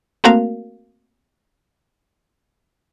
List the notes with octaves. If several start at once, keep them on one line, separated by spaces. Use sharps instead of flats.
A3 A#3 C4 F#4 A#4 F5